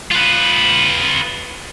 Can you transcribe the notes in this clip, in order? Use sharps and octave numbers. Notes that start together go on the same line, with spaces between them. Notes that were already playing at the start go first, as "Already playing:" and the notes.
F4 B4